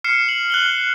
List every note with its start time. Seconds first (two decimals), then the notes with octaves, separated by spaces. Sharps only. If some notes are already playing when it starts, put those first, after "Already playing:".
0.04 F6 C7 C#7 E7
0.29 F#7
0.50 F#6 F#7 G7